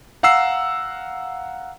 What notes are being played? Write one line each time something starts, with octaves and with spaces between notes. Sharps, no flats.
F5 F#5 A#5 E6 C7